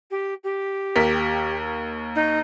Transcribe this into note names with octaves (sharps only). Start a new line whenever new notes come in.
G4
G4
D#2 A#4 B6
D#4